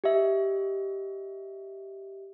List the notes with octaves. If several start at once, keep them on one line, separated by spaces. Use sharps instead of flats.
G4 D#5 E5